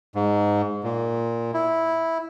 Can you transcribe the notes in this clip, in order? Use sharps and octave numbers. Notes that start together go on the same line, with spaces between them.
G#2
A#2
E4